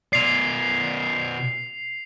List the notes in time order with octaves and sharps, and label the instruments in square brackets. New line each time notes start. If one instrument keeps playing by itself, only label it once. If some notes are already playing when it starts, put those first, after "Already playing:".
[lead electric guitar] B2 D5 [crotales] C7 F7